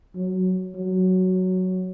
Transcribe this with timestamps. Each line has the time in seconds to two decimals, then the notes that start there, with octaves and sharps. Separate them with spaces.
0.16 F#3
0.75 F#3